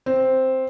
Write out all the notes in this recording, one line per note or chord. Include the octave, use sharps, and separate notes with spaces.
C4